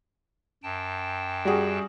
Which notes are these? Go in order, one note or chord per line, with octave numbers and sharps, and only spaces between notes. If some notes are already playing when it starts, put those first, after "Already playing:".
F#2 G5 A5
G3 F#4 G#4